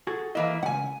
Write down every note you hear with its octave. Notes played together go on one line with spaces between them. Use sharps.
F#4 G#4 A4
E3 A#3 E4 D#5
C#2 G#2 F#5 G#5